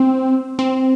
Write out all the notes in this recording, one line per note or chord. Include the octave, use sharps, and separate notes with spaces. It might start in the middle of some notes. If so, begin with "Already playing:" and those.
Already playing: C4
C4